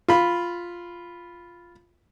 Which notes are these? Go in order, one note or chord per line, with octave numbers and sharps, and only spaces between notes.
F4 B5